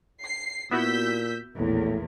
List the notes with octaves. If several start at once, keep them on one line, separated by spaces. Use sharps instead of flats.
C7
A#2 B3 E4 F#4 E6 G6 B6
A#1 E2 A2 A#3